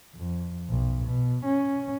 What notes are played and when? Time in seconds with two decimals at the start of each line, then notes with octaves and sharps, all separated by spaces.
0.16 F2
0.70 B1
1.05 B2
1.46 C#4